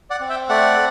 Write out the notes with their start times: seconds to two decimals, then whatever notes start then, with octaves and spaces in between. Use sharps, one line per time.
0.10 D5 F#5
0.20 C4
0.29 E5 G5
0.49 A3 D5 F#5